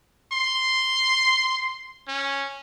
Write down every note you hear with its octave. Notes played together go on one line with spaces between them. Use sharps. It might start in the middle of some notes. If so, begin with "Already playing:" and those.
C6
C#4